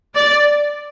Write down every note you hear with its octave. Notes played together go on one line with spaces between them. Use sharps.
D5